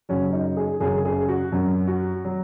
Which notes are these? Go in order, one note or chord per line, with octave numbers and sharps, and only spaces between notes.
F#2 C#3 F#3 C#4
D#4
G#4
F#2 C#3 F#3 G#4
G#4
F#4
F#2 F#3
F#4
F#3